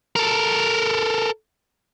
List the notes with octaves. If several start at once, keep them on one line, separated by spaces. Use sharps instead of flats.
A4 A#4